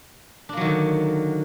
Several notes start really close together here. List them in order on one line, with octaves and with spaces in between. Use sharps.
D4 A#3 F#3 D#3 D3